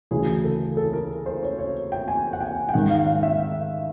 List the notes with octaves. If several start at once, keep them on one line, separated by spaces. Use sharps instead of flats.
D2 C#3 E3 G#4
A4
A4
A#4
C5
C#5
C#5
G5
G#5
F#5
G5
G5
G#2 D#3 F#5
F5
F5
E5